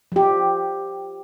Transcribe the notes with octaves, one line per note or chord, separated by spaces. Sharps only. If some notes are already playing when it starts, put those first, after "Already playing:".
F3 G4